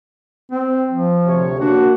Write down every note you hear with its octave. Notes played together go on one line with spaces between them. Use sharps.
C4
F3
D2 C3 C#5
A#3 D4 F#4